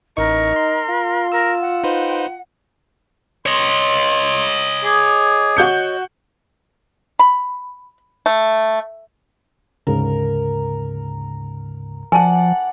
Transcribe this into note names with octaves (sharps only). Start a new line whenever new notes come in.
A1 D#4 A#4 C#6
C6
F4
A#4 E6
F#5
D#4 B4 C5
C#5 D#5 C6
G#4 D6
F#4 G6 C#7
B5
A3
D2 G#2 C#3 A#4
F3 D5 F#5 G#5 A5